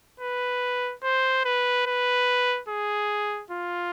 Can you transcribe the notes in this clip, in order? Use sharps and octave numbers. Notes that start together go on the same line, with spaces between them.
B4
C5
B4
B4
G#4
F4